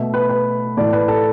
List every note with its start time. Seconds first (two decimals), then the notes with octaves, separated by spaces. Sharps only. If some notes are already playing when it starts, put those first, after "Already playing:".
Already playing: B2 A3 E5
0.14 B4
0.29 B4
0.77 A2 E3 A3 D5
0.93 B4
1.08 A4